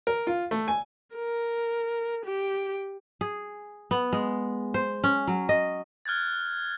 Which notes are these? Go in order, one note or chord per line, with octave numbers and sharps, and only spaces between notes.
A#4
F4
A3
G#5
A#4
G4
G#4
B3
G#3
C5
C#4
F#3
D#5
F6 F#6 G#6 A6